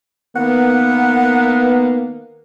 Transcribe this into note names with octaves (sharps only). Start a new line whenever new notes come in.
D#3 A#3 B3 F#5